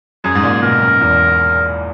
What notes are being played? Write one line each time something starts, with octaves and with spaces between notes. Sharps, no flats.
F#2 G#4
G#2
A#2
B2 A#4
F#2
E2